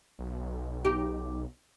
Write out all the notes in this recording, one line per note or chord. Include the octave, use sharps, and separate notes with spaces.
B1
D#4 G4